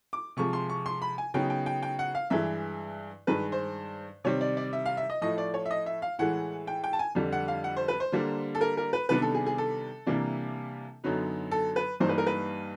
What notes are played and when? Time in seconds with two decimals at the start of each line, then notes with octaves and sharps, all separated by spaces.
0.13 D6
0.37 C3 F3 G#3 C#6
0.53 C6
0.69 C#6
0.86 C6
1.02 B5
1.18 G#5
1.34 C#3 F#3 B3 D#4 G5
1.50 G5
1.66 G5
1.82 G5
1.99 F#5
2.15 F5
2.30 G2 E3 G#3 E5
3.27 G2 D#3 G#3 B4
3.52 C5
4.24 C3 D#3 G3 C4 C#5
4.41 D5
4.57 D5
4.73 E5
4.86 F5
4.97 E5
5.10 D#5
5.21 A2 F3 A3 D#5
5.38 D5
5.54 C#5
5.66 E5
5.71 D#5
5.86 E5
6.02 F5
6.19 A2 E3 G#3 F#5
6.67 G5
6.84 G5
6.93 A5
6.99 G#5
7.15 F2 D3 G3
7.32 F#5
7.48 F5
7.64 F#5
7.77 C5
7.88 B4
8.00 C5
8.12 D3 G3 A#3 D4
8.55 A4
8.61 A#4
8.77 A#4
8.93 B4
9.09 C3 D#3 G3 B3 D4 B4
9.22 A4
9.34 G#4
9.46 G#4
9.58 A4
10.06 C3 E3 G3 A#3 D4
11.04 F#2 D3 F#3 B3 D#4
11.51 A4
11.76 B4
12.00 G2 E3 G3 A#3 D#4 C5
12.09 B4
12.18 A#4
12.27 B4